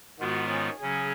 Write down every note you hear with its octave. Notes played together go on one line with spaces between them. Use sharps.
G#2 D#3 G#3 B3 F4 F#4
C#4
C#3 F#3 C#4 G#4